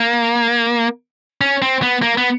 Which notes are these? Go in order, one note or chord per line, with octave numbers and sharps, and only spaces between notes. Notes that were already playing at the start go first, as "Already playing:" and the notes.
Already playing: A#3
C#4
C4
B3
A#3
B3